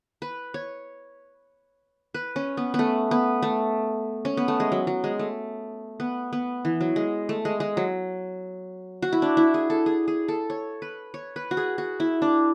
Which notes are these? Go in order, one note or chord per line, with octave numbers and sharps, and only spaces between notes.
B4
C#5
B4
C#4
B3
B3
A3
B3
A3
C#4
B3
A3
G#3
F#3
F#3
G#3
A3
B3
B3
E3
F#3
G#3
A3
G#3
G#3
F#3
F#4
E4
D4
E4
G#4
A4
G#4
G#4
A4
C#5
B4
C#5
B4
F#4
G#4
F#4
E4
D4